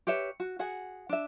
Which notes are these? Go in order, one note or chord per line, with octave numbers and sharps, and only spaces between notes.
G4 B4 C#5 E5
F#4
F#4 G#4 F#5
D4 E5